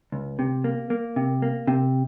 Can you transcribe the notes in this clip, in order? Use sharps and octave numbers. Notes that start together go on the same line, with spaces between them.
C#2
C3
A#3
A#3
C3
A#3
C3